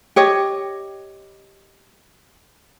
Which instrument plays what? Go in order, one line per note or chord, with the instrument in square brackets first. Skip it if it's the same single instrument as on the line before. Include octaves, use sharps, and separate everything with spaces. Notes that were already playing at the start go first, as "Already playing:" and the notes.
[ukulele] G4 C#5 D#5